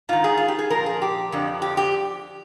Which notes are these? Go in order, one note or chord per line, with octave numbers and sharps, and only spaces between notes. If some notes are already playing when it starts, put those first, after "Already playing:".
G#2 D#3 F4
G#4
F4
G4
G#4
A#2 F3 A#4
G#4
G4
F2 D3 F3
G4
G4